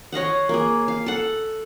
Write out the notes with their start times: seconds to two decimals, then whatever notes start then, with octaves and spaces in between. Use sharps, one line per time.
0.12 C#5 D#5 F5 F#5
0.49 A#3 G#4
0.88 F5
1.06 A4 F#5